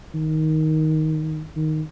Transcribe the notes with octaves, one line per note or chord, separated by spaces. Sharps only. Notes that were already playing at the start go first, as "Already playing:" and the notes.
D#3
D#3